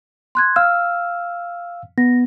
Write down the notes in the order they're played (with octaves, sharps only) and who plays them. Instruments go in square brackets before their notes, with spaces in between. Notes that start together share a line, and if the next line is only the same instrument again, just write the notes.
[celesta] C6 F#6 G#6
[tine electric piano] F5 E6 [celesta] F6
[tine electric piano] B3 [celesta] A#6